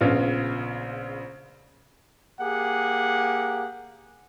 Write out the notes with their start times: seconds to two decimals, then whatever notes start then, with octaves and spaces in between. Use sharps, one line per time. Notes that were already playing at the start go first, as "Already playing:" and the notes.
0.01 A#1 C#3 B3 F4
2.41 A#3 G4 G#4 F#5